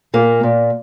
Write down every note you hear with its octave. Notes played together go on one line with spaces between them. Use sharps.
A#2 A#3
A#2